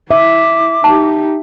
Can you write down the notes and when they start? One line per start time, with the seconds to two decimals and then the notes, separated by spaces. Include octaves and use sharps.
0.11 E4 E5 D6
0.84 D#4 G4 A5